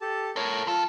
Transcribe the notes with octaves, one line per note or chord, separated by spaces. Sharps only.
G4 A4 A5
A4 A#4 C#5
F2 F4 A4